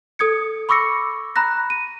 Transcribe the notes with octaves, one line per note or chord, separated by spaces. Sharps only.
A4 D#6 G#6 C#7
B5 C#6 D6 E6 A#6 C#7
A#5 B5 F#6 A#6
D#7